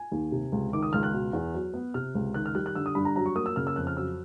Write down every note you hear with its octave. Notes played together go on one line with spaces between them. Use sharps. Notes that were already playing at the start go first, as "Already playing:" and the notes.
Already playing: G#5
D#2
C3
C#2
D#3 D6
D#6
C#2 F6
F#6
B2
E2
F#3
B3
C3 F6
C#2
D#3 F#6
F6
G3 F#6
F#6
D3 E6
D#6
G2 B5
A#5
F#3 A#5
C#6
A#3 D#6
E6
C#3 F6
E6
F2 F#6
F6
F#3 E6